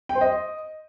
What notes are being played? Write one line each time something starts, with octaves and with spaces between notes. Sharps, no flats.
G5
C5
D#5